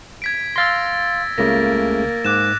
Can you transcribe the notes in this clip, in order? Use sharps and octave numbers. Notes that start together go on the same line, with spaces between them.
G#6 B6 D7
F5 C6 E6 A6 A#6
C#2 C#3 A3 A#3 A#6
G#2 D6 F#6 E7